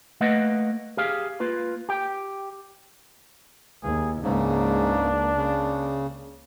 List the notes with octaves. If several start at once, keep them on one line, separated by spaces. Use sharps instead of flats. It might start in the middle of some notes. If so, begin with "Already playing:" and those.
A3 A#3 B4 D#5 F#5
G4 G#4 F5
A#3 F4 B4
G4 G5
D#2 G#4
C#2 G#2 C#3 A#3 D4
C#3